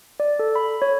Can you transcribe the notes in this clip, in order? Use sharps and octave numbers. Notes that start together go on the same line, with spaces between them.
D5
A4
B5
C#5